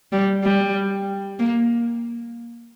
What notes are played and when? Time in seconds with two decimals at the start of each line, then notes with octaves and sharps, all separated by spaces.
0.12 G3
0.44 G3
1.39 A#3